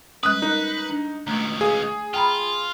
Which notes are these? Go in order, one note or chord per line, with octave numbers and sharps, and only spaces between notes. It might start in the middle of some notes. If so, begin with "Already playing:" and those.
G3 G#3 C#4 B4 D#6 F#6
D#4 A#4
D4
C#2 B2 A3 A#5
G#4 F5
F4 G5 A#5 B5